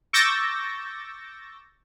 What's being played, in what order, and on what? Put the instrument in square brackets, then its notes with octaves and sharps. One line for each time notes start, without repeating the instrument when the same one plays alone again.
[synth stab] C#6 D6 E6 G6 A6 A#6